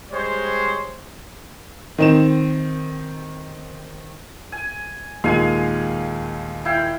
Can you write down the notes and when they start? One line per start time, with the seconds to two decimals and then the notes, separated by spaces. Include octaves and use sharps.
0.12 G3 G#3 C5 C#5
1.98 D#3 C4 E7
4.52 G#5
5.24 D#2 A#2 G#3 F5 G#5
6.65 E4 F5 G5